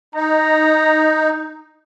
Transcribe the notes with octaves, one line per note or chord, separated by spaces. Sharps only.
D#4 A#5